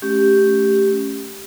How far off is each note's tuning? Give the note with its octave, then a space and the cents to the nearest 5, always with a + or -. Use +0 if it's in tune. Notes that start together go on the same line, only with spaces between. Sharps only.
A3 -25 C#4 +0 G4 +0